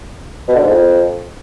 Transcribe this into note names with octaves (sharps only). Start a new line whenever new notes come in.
B2
D3
G#2
F2